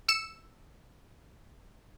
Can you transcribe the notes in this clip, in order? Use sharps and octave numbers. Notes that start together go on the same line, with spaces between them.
E6 C#7 E7